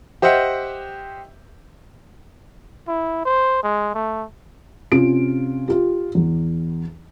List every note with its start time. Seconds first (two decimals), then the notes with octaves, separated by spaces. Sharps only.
0.22 G4 C5 D#5 E5 F#5
2.88 E4
3.25 C5
3.63 G#3
3.94 A3
4.92 C3 C#4 F4 D7
5.68 F4 G4
6.15 E2